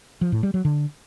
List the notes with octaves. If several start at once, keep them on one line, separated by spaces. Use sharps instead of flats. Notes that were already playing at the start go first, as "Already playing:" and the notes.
F3
A2
G3
F#3
D3